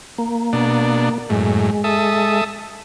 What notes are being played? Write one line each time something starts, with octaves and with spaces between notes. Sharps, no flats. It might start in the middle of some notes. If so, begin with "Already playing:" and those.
A#3
B2 D4
F#2 A2 G#3
A4 E5 D#6